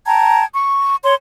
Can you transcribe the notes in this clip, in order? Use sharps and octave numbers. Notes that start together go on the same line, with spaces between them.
G5 A5 A#5 G#6
C#6
C#5 C6